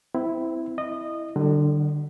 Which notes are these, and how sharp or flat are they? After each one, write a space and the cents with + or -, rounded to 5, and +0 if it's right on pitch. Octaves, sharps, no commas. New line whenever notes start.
C4 -25 E4 +0
E4 +0 D#5 -20
D3 +20 G3 -35